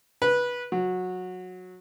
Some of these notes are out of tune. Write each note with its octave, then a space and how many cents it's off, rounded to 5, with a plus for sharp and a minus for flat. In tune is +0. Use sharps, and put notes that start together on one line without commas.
B4 -15
F#3 -15